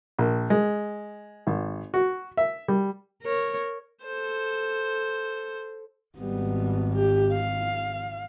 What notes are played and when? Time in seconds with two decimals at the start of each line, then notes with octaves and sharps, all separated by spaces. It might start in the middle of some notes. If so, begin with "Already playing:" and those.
0.18 A#1
0.50 G#3
1.47 G#1
1.94 F#4
2.37 E5
2.68 G3
3.22 A#4 C#5
4.03 A4 C5
6.18 G#1 G3 B3
6.95 G4
7.32 F5